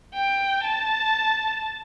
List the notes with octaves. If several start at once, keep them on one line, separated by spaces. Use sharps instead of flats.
G5
A5